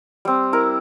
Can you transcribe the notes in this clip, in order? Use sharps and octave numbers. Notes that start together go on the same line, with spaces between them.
G3 C4
E4 A#4